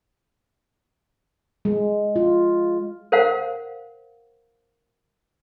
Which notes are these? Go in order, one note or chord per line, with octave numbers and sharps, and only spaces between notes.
G#3
F4
A#4 C5 F5 F#5